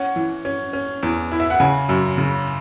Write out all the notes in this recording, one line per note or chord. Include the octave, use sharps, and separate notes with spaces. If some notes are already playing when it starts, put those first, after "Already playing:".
Already playing: C#4 F#5
E3
C#4
C#4
E2
E4
E5
F#5
C#3 G#5
F#2
C#3